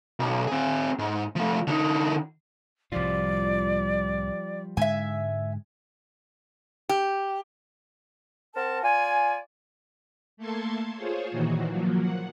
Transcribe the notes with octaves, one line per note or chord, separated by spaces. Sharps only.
B1
C4 G#4
G#2
F3 A3
D3 D#4
C2 A2 F3 G3 F4 D5
G#2 D3 G#3 E5 G#5
G4
C4 A#4 F#5 A5
F4 D5 G#5
A3 A#3 A4 A5 C6 G#6
F4 G#4 C5 C#5
A#2 D#3 E3 F#4
F3 F#3 A#3
F#5